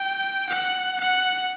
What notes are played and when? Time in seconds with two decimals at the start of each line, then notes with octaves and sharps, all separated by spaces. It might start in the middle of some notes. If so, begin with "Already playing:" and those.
Already playing: G5
0.49 F#5
1.00 F#5